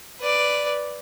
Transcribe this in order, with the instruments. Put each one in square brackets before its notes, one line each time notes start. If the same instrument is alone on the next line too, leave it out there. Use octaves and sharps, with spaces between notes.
[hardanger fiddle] B4 D5